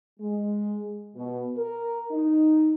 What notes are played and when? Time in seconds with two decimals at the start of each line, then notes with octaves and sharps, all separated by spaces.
0.20 G#3
1.16 B2
1.57 A#4
2.12 D#4